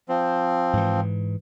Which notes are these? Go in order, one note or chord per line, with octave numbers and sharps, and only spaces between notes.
F3 C4
G#2 E3